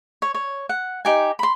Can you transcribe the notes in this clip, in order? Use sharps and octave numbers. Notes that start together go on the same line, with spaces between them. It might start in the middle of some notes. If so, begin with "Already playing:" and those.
C#5
C#5
F#5
D#4 G4 G#5
B5 C6